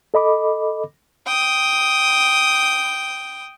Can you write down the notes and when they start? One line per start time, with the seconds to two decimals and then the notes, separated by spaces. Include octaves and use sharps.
0.14 A4 D#5 B5 D6
1.27 G5 D#6